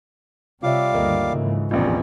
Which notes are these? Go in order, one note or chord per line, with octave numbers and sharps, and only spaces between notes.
C3 G3 F4 C#5 E5 F5 D6
D2 G2 D#3 A#3 A4 D#5
G#2 C#3 E3
F1 A#1 E2 G3 C#4 F4